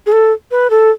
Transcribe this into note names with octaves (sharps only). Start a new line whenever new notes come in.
G#4
A4
B4
A4